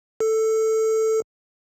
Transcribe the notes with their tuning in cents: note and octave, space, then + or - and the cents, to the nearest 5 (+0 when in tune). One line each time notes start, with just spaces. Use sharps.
A4 +5